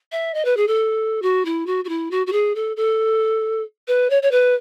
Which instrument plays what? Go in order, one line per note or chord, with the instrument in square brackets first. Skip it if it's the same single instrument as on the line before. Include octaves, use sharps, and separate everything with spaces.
[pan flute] E5
D#5
B4
G#4
A4
F#4
E4
F#4
F#4
E4
F#4
F#4
G#4
A4
A4
B4
C#5
C#5
B4